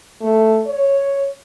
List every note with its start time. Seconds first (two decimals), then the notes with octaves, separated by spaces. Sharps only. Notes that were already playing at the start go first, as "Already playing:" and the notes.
0.21 A3
0.66 C#5